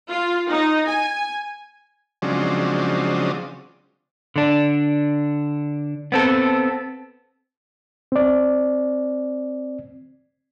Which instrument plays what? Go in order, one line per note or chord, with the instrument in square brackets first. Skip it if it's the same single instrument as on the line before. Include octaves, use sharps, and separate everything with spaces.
[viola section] F4
D#4
G#5
[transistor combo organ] C#3 F3 F#3 G#3 C4 D4
[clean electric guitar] D3 D4
B3 C4 A4
[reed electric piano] C4 D5